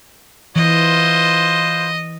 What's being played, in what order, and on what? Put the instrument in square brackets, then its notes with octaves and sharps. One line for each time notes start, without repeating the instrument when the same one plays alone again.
[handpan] E3 [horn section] F4 B4 C5 [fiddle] D#5